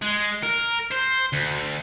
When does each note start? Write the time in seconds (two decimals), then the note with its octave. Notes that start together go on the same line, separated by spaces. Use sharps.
0.02 G#3
0.43 A#4
0.92 C5
1.33 D2